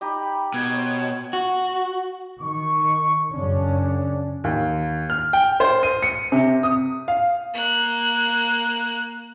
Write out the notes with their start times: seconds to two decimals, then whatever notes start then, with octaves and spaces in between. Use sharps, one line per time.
0.01 D#4 G4 D#5 B5
0.54 B2 G#6
0.73 C5 C#5
1.33 F#4
2.40 D#3 C#6
3.31 F#2 C#3 C#4 D4
4.44 D#2
5.10 F6
5.33 G5
5.60 C5
5.83 D#7
6.02 C#7
6.32 C3
6.63 D#6
7.08 F5
7.54 A#3 F#6